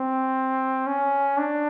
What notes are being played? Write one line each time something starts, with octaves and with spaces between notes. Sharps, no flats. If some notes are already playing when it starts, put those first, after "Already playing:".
Already playing: C4
C#4
D4